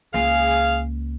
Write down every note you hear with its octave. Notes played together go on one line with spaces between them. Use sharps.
C#2 A#3 G#4 F5